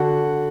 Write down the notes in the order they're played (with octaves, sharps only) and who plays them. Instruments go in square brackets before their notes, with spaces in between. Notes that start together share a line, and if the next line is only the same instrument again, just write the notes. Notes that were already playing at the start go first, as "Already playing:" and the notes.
Already playing: [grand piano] D3 F#4 F#5